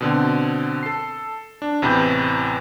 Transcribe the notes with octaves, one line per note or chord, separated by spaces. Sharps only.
B2 D3 C4
A4 C7
D4
A1 E2 C3 B4 B5 G6